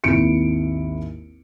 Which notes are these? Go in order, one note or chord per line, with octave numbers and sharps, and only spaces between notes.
G#1 D#2 E4 C#7 D7